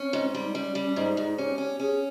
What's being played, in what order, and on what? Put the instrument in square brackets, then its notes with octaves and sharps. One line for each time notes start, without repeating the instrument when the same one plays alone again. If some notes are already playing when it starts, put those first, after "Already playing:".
Already playing: [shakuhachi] C4 [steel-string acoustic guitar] C#4
[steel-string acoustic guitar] G#2
G3
[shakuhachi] D#4
[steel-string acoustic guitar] G3 [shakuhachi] C#4
[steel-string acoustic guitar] G3
[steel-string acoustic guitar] G#2 [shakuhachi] D#4
[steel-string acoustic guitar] G#2
[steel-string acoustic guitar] C#4 [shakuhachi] G4
[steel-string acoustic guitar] C#4 [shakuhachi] G4
[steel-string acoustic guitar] C#4 [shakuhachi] G#4